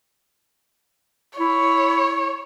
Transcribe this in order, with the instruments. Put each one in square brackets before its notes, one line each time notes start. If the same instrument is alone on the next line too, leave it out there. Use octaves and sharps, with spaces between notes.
[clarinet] E4 [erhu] C#5